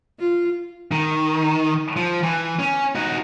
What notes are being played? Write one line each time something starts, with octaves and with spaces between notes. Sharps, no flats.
F4
D#3
F3
E3
C#4
D#4 F#4